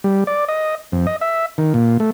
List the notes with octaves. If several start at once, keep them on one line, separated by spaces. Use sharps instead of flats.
G3
D5
D#5
F2
D#5
E5
D#3
A#2
A3